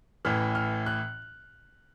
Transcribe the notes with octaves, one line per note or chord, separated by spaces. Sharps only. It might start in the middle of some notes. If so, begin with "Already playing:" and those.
A1 A2 E3 F6
F6
F#6